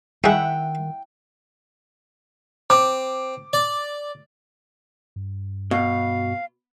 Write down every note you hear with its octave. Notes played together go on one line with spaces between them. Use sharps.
D#3 D#4 E4 G#4 E5 F#5 G5
C4 D6
D5
G2
B2 F5